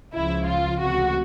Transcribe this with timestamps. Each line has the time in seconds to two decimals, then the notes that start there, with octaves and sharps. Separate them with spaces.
0.13 C#2 C#3 F3 E4
0.47 F4
0.81 C#2 C3 E3 A3 F#4